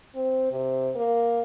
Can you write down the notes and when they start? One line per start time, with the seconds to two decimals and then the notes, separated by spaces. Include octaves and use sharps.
0.15 C4
0.51 C3
0.95 A#3